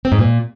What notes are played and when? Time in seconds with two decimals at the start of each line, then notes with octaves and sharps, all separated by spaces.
0.05 C4
0.12 G#2
0.19 A#2